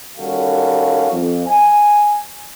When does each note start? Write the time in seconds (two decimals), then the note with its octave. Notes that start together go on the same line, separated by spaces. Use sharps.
0.18 D#2 G3 C#4 F#4 A4 F5
1.11 F2
1.47 G#5